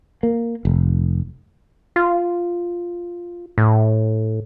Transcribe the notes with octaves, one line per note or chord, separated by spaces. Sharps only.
A#3
F1
F4
A2